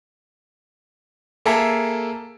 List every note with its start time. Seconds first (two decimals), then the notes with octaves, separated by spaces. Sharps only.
1.46 A#3 G#4 A4 E5 A#5